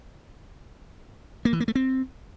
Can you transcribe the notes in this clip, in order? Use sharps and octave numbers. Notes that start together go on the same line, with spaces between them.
A#3
E3
A#3
A3
C4